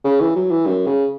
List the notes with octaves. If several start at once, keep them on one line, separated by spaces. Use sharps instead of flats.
C#3
E3
F#3
E3
F#2
C#3